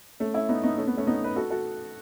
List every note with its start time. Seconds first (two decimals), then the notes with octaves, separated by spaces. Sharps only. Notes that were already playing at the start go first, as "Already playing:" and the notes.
0.20 A3 C#4
0.34 C#4 E4
0.49 B3 D#4
0.64 B3 D#4
0.78 A3 C#4
0.87 B3
0.97 A3 C#4
1.07 B3 D#4
1.24 B4
1.36 F#4 A4
1.51 F#4 A4